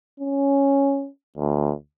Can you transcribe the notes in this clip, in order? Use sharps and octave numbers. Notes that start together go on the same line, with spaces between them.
C#4
D2